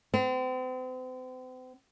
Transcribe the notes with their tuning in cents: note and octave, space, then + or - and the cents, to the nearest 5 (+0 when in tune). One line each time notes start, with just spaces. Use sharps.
C4 -40